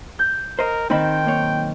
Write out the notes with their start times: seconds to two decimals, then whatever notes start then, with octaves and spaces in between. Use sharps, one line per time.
0.19 G6
0.59 A#4 C5 D#5
0.90 D#3 C4 D#4 G5 B5
1.25 B1 A#3 C#5